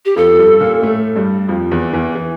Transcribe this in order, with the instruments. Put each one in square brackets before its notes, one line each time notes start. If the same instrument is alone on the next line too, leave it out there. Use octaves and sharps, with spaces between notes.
[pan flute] G4
[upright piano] F2 F3 [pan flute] A4
[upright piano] G2 G3
A#2 A#3
A2 A3
G2 G3
F2 F3
E2 E3
E2 E3
E3